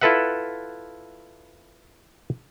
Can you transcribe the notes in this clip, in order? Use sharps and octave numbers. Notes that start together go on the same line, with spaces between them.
E4 F4 A4 B4 E5 F#5